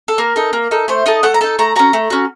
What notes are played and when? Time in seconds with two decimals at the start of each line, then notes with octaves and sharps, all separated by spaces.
0.08 A4
0.18 A#3 A#4
0.36 D#4 A4
0.53 A#3
0.71 D#4 A4
0.88 A3 C5
1.06 D#4 A4 D#5
1.23 A3 F#5
1.34 A#5
1.41 D#4 A4 A5
1.59 A3 A#5
1.76 C#4 F#4 A#5
1.93 A3
2.10 C#4 F#4